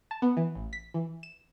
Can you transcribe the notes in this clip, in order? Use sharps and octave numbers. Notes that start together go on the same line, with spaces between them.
A5
B3
E3
A1
B6
E3
E7